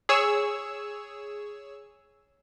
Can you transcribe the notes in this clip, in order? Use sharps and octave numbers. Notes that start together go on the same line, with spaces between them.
G#4 C#5 E6